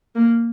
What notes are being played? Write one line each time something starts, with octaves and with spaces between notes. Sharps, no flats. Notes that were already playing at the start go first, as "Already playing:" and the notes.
A#3